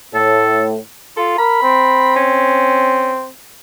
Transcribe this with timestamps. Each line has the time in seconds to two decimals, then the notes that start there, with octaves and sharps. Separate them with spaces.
0.14 A2 A4
1.17 F4 A4
1.38 A#4 B5
1.63 C4
2.16 C#4